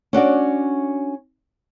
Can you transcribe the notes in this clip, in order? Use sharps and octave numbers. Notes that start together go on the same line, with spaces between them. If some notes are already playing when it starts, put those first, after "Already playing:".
C#4 D4 F#4 D5